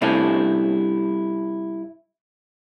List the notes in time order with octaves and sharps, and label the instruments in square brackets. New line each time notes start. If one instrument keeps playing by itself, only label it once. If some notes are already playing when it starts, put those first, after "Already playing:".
[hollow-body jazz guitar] G2 C3 G3 A3 C#4 E4